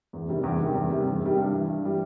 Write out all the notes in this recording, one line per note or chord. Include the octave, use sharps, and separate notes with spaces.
E2
C3 D#3 G3
E2
C3 D#3 G3
E2
C3 D#3 G3
E2
C3 D#3 G3
G2
E3 G3
G2
E3 G3